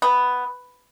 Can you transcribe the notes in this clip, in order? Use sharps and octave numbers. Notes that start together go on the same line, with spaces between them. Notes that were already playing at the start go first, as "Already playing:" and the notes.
B3